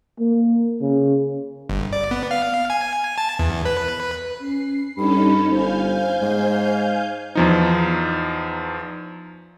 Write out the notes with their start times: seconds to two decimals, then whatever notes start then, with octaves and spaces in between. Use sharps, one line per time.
0.19 A#3
0.81 C#3
1.69 G1
1.93 D5
2.11 B3
2.31 F5
2.70 G#5
3.18 A5
3.39 E2
3.65 B4
4.40 C#4 C7
4.97 G2 C#4 D#4 A4 B5
5.51 G1 C5 F5 G#5 G6
6.21 G#2
7.35 E2 F3 D#4